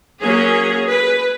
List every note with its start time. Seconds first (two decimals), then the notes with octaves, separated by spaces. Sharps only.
0.19 F#3 A#3 C#4 G#4
0.88 B4